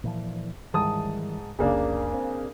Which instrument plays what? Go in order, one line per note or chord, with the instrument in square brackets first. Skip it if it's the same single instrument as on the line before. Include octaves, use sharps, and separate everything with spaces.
[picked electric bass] A#2 E3 F3
[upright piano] G#2 A5 D#6 [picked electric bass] D#3 E3 G3
[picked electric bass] F1 C2 [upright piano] C#3 A#3 D4
[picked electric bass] C4